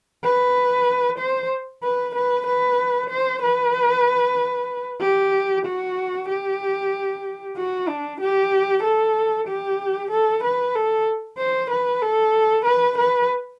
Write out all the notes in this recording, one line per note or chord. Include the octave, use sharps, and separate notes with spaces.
B4
C5
B4
B4
B4
C5
B4
G4
F#4
G4
F#4
D4
G4
A4
G4
A4
B4
A4
C5
B4
A4
B4
B4